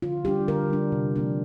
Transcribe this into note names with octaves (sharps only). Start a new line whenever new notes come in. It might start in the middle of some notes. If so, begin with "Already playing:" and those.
D3 F4
G3 D4 G4
D3 A#4
G3 D4
C3
F3 A#3 D4